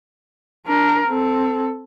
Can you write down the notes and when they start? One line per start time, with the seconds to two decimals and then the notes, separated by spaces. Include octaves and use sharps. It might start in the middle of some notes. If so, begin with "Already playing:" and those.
0.67 D4 A#4
1.08 C4 A4